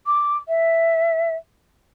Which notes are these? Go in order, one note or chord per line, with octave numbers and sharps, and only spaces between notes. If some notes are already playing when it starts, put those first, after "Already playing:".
D6
E5